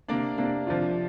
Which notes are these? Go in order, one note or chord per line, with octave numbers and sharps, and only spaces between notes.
C3 A#3 D4 D5
C3 A#3 D4
C3 F3 D4 F4